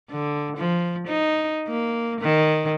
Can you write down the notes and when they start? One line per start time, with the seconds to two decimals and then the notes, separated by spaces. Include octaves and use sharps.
0.10 D3
0.57 F3
1.07 D#4
1.68 A#3
2.21 D#3